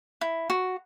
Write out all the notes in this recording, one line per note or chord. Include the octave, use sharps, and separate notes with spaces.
E4
F#4